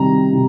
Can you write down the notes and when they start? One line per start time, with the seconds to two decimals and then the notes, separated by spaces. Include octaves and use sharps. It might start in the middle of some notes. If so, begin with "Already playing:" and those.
Already playing: C3 D#3 G3 A#5
0.32 C3